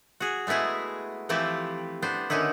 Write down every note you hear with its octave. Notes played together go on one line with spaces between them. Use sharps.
F#4 G#4
G#3 A3 B3 E4 G#4
E3 F3 A3 C4 E4 G4
B3 D4 C5
D3 D#3 C#4 D#4 E4